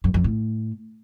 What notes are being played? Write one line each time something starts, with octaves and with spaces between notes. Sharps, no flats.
F#2
F2
A2